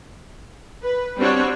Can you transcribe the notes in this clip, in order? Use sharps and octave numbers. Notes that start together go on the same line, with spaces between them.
B4
G3 C4 D4 F#4 C#5